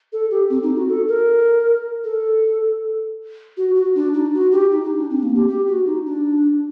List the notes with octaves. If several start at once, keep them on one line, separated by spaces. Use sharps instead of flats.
A4
G4
C4
D#4
F#4
A4
A#4
A4
F#4
F#4
D4
D#4
F#4
G4
D#4
D#4
D4
C4
A#3
G4
G4
F#4
D#4
D4